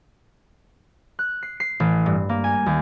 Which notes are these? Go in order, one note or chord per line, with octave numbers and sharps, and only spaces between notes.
F#6
C7
C7
A1
G2
A#3
G#5
D#2